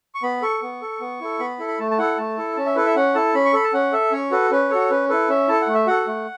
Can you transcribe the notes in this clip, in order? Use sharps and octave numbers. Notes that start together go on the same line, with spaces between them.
C#6
B3 B5
A4 C#6
B3
A4
B3
E4 A4
B3 B5
E4 A4
B5
A3 A5
A5
E4 A4 F#5
A3 A5
E4 A4
C#4 A5
E5
E4 A4 B4
E5
C#4 F#5
E4 A4 A5
C#4 B5
C#6
A4 B5
A5
C#4 F#5
A4 E5
C#4 C#5
F#4 A4 B4
C#4 B4
F#4 A4 C#5
C#4 B4
E4 A4 B4
C#4 E5
E4 A4 A5
F#5
A3
E5
F#4 A4 F#5
A3